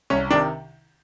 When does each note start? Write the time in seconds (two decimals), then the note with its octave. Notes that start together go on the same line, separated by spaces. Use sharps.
0.10 C2 C#4
0.31 C3 D#3 D4